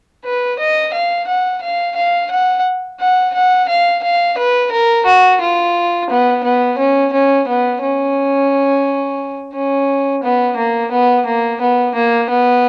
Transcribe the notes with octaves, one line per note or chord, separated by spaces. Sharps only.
B4
D#5
F5
F#5
F5
F5
F#5
F#5
F#5
F5
F5
B4
A#4
F#4
F4
B3
B3
C#4
C#4
B3
C#4
C#4
B3
A#3
B3
A#3
B3
A#3
B3